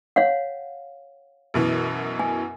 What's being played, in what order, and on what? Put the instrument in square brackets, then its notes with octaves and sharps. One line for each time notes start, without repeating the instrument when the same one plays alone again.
[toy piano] C#5 F5 F#5
[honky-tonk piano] F#2 B2 E3
[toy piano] G#5